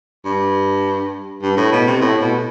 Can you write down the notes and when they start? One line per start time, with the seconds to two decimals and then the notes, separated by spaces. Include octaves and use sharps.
0.25 G2
1.42 G2
1.57 A2
1.72 B2
1.87 C3
2.01 A2
2.21 B2